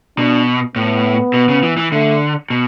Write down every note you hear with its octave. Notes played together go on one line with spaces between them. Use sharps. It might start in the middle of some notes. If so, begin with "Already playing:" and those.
B2 D4
A2 B3
B2
C#3
E3
E3
D3 A3
B2